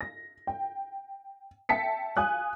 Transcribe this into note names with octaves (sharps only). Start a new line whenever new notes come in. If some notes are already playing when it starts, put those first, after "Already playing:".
A#6
G5
E5 G5 A5 B6 C#7
F5 G#5 D#6 F#6